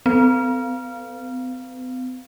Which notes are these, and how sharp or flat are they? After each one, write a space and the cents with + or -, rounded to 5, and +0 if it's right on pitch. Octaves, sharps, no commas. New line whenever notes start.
C4 -45 B4 +35